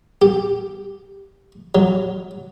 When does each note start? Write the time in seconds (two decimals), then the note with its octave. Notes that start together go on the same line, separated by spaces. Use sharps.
0.22 G4
1.75 F#3